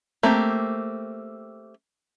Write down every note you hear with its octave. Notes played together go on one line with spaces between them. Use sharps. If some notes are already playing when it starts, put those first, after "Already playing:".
A3 A#3 C4 G4